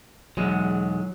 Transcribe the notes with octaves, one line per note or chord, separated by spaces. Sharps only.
B1 E2 F#3 G#3